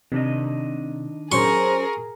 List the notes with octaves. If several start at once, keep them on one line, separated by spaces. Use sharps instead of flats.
C3 D#3 D4 D#5
F#3 C#4 G#4 A#4 C5 C6 C#6